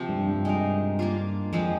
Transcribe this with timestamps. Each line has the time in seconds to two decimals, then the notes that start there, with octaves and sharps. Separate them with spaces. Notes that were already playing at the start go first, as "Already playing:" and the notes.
Already playing: C3 F3 C4
0.09 G2
0.27 G2
0.45 G#3 D#4 A#4
0.99 A#3 D4 F4
1.52 F2 F3 G#3 C4 F4